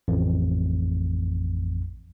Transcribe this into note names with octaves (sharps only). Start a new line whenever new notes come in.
A1 F2